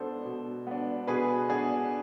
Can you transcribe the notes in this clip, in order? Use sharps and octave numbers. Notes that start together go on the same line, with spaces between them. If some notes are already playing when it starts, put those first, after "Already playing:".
Already playing: B2 B3 D4 A4 C5
B2
B3 D4
B2 G#4 B4
B3 D4 G#4